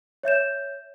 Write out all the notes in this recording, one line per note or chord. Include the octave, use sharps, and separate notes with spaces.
C#5 E5 G6 E7